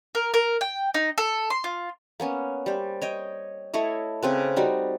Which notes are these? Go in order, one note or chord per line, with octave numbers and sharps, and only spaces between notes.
A#4
A#4
G5
D#4
A4
C6
F4
A#3 B3 C#4
G3 C5
C#5 D#5 G5
A3 E4 C#5 D#5
C#3 C4 B4
G3 D#4 F#4